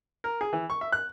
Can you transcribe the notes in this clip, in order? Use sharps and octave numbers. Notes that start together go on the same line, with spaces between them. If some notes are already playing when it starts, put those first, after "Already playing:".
A#4
G#4
E3
C#6
E5
F#6